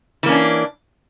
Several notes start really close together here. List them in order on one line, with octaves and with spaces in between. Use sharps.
E3 A#3 C#4 D4